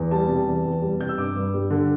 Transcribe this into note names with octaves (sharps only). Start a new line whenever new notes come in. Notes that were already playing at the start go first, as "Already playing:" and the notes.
Already playing: E2
G3 A5
C3
E2
E2
G3
C3 G6
E6
G2 D6
G2
G3
D3